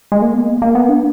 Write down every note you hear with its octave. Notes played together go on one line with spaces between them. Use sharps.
G#3
A#3
B3
A#3
A#3
B3
D4